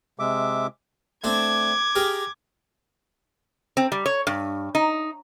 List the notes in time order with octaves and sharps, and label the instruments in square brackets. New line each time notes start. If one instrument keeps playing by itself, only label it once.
[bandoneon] C3 G#3 E5 D6
[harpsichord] A3 C4 D4 [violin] D6 G#6
[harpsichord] G4 G#4 A#4
[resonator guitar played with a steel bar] C4
G3
C#5
G2
D#4